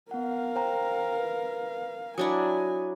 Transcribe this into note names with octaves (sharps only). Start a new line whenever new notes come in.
B3 A#4 F5 F#5
C5 G5 A#5
B4
F#3 D4 E4 G#5 D#6